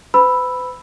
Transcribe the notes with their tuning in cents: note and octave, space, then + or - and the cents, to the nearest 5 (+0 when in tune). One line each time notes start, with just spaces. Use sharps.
B4 +45 B5 +0 E6 +0